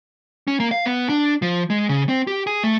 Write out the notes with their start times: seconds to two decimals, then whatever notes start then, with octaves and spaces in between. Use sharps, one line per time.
0.47 C#4
0.60 A#3
0.71 F5
0.86 B3
1.09 D4
1.42 F3
1.70 G#3
1.89 C#3
2.09 C4
2.27 G4
2.47 G#4
2.64 A3